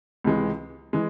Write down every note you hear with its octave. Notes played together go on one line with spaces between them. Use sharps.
C#2 C3 E3 G#3
E3 G#3